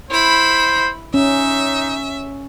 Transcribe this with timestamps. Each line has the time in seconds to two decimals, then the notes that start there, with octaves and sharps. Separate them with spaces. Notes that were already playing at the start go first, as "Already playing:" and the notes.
0.11 E4 C5 B5
1.14 C#4 D#4 E5